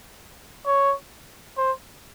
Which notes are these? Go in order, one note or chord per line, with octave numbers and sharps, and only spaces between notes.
C#5
C5